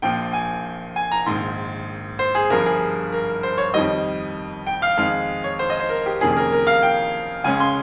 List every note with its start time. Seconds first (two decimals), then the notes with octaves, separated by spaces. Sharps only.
0.02 A#1 A#2 F3 G5
0.33 G#5
0.96 G#5
1.11 A#5
1.26 A#1 G#2 D#3 C6
2.19 C5
2.35 G#4
2.50 G1 G2 F3 A#4
2.66 G#4
3.12 A#4
3.43 C5
3.58 C#5
3.74 F2 D#3 G3 D#5
4.67 G5
4.82 F5
4.97 F2 D#3 G#3 F5
5.44 C#5
5.59 C5
5.70 D#5
5.80 C5
5.89 A#4
6.06 G4
6.21 F1 F2 D#3 A#3 C#4 G#4
6.37 A#4
6.52 A#4
6.67 F5
6.83 G5
7.44 C#2 C#3 G#3 C#4 G#5
7.60 C6